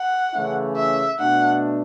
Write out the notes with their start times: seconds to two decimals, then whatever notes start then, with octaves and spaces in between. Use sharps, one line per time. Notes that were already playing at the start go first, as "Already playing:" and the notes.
Already playing: F#5
0.34 C#3 E3 A3 C#4 E4
0.77 E5
1.19 B2 A3 D4 F#5